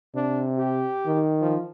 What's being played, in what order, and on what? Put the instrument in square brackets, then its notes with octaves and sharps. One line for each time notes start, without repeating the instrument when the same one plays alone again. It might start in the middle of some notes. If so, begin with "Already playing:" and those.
[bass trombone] C3 [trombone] D4
[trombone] G4
[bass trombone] D#3
[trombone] F3